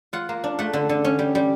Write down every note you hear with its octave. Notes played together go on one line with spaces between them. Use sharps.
F4 F#5
A#3
D4
A3 F#5
D3
D3
C#4
G3
G3